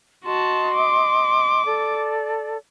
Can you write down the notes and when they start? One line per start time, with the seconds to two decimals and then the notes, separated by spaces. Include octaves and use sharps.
0.25 F#4 D#5 A5 C6
0.74 D6
1.64 A4 D5